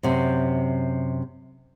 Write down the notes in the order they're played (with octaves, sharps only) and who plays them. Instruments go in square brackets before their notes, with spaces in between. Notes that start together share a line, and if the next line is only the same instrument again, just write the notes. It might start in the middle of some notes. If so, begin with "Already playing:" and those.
[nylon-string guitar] F#2 C3